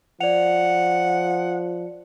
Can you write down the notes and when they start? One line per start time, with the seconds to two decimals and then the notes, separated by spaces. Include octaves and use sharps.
0.21 F3 D5 F#5 F7